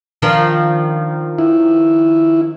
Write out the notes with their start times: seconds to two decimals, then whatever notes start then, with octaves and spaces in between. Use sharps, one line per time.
0.22 D#3 F3 D4
1.38 E4